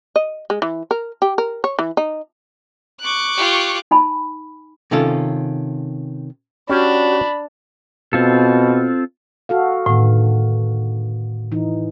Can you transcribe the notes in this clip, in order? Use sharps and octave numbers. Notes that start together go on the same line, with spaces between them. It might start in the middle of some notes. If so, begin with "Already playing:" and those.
D#5
G#3
E3
A#4
G4
A#4
C#5
E3
D#4
C#6 D6 F#6
F4 G4
D#4 G#5 B5
C3 D#3 C#4 F4 A4
C#4 D4 F#4 G4 D5 B5
B2 C4 F4 A4
F#4 A4 F5
A2 D3 D#3 B3
E3 D#4